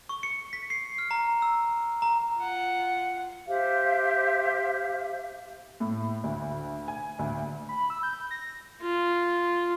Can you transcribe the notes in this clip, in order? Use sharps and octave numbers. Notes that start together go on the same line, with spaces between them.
C#6
C#7
B6
C7
F6
A#5
E6
A#5
F4 F#5
G4 C5 E5 F5
A2
D2
G#5
D2
B5
E6
G6
A#6
F4